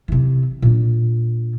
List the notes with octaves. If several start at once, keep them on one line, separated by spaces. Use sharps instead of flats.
C3 E3
A#2 D4